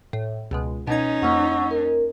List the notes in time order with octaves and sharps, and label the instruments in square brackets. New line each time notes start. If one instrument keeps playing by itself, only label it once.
[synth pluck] A2
C#2 B2 G#3
[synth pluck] B2 G#6 [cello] C#4 D#4
[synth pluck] F2 A#3 [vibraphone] F#5 C#6 E6
[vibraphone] A#4